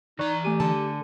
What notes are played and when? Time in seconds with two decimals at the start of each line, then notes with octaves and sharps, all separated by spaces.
0.19 E3 D#4 D5 A#5 C#6 F#6
0.44 A3 G4 G#5 D#7
0.60 D3 A4 A5